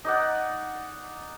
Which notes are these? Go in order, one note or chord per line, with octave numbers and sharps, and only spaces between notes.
D#4 D5 F#5